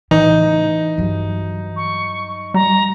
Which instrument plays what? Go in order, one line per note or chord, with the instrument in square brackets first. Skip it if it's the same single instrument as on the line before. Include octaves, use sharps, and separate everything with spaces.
[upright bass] A2 C#3 [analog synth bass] E3 [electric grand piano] D#4
[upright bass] G2 F#3
[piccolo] C#6
[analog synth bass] G3 [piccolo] A#5